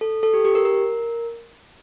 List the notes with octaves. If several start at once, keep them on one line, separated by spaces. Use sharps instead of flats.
A4
A4
G4
G4
A#4
A#4